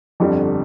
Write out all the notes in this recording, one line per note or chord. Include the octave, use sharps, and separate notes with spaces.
G1 F2 D3 G3